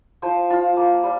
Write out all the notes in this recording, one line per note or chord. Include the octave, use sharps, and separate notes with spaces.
F3 C5
F4
A#3
G3